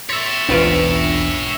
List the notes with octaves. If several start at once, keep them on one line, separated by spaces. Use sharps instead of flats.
C#5 E5 C6 A6 B6
F#1 B1 E2 D4 F4 B4 D7